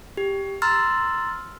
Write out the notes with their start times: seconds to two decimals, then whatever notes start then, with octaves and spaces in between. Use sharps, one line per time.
0.17 G4
0.62 A#5 C6 E6 F6 A6